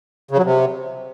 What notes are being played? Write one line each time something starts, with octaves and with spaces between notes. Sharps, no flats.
C#3
F#3
C3